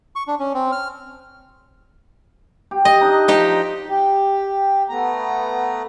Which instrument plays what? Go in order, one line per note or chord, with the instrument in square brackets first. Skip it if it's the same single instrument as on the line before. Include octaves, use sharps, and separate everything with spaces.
[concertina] C#6
D4
C#4
C4
F6
[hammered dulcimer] G4
[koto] D#5
[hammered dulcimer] D4 D#4
[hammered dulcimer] F3 [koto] D#4 G4 D#5
[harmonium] G4
A3 B3 A#5